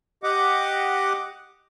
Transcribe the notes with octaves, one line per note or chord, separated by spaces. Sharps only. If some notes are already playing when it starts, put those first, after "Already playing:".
G4 D#5 F#5 D6